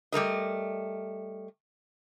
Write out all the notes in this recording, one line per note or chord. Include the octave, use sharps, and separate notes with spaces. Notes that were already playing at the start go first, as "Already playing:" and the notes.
G3 A3 A#4 D#5